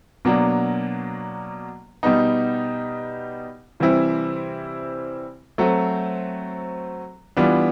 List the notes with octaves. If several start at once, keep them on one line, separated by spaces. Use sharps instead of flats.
B2 F#3 A#3 D4
B2 G3 B3 D#4
C3 E3 G3 C4 E4
F#3 A3 C4
E3 G3 B3 D4 F4